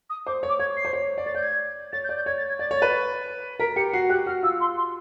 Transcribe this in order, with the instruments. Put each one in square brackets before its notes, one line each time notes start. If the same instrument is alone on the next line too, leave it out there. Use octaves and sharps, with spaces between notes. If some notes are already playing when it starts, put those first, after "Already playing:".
[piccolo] D#6
[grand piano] C5 [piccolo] D6
[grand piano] C#5
[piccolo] D6
[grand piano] C#5 [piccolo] G#6
[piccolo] C7
[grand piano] C5
C#5
D5
[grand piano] C#5 [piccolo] A6
[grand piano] D5 [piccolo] G6
[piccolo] G#6
[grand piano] C#5 [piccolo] A6
[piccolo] G6
[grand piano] D5
[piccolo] G6
[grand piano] C#5 [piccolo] G#6
[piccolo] A6
G#6
[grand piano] D5 [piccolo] A6
[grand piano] C#5
[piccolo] A6
[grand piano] B4
[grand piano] A#4 [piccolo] B6
[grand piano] G4 [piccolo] C#7
[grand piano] F#4 [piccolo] C7
[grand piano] G4 [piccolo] F#6
[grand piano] F#4 [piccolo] F6
[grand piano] F4 [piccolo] E6
[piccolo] C6
C6